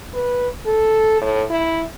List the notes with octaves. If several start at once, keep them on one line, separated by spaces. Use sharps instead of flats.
B4
A4
A2
E4